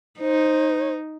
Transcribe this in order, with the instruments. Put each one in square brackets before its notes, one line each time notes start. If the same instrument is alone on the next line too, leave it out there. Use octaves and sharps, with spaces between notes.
[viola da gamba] D#4 [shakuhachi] C5